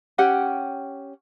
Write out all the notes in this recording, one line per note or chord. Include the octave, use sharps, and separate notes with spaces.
C#4 G4 F#5 G5